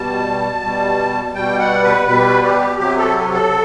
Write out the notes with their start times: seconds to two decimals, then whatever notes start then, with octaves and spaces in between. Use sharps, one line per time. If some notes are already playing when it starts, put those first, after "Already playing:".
Already playing: B2 G3 A5
0.62 B2 G3
1.34 B2 G3 G5
1.59 F#5
1.84 B4
2.07 B2 G3 B4
2.43 G4
2.79 C3 F#3 G4
2.98 A4
3.34 A4